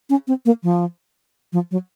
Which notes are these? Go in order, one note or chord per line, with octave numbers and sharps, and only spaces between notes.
C#4
C4
A#3
F3
F3
F#3